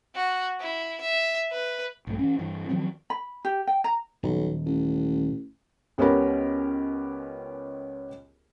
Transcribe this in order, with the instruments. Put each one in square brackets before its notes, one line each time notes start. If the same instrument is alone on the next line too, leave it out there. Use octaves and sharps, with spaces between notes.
[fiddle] F#4
E4
E5
B4
[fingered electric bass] A#1 G2 A3
E3 C#4
G2 E3
D#3 F3 F#3 C4
[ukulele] B5
G4
G5
A#5
[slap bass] D#1 [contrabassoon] B1
[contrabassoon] A1
[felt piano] C#2 B3 C#4 G4 A#4 B5